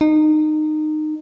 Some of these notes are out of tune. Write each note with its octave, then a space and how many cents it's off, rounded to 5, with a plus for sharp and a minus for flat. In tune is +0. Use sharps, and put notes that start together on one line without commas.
D#4 -20